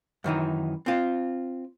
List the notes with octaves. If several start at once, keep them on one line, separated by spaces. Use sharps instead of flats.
F#2 D#3 E3 D#4
C4 F4